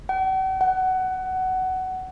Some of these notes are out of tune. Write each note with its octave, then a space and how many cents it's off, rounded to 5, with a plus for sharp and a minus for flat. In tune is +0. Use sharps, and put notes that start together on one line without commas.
F#5 +45
F#5 +15